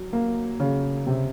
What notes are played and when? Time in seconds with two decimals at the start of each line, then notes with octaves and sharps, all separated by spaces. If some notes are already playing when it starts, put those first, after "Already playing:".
Already playing: F#3
0.13 A#3
0.60 C#3
1.07 C3